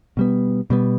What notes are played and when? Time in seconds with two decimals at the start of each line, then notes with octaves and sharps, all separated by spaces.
0.17 B2 G3 B3
0.70 B2 G3 B3